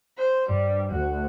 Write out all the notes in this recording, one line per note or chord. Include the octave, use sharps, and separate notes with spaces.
C5
G2 G3
D2 F#4